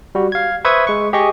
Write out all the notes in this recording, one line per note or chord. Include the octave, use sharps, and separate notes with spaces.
G3 F#4
F5 G#6
B4 C5 E5 C#6 D#6 G#6
G#3 C#6
G4 G#4 D#5 C#6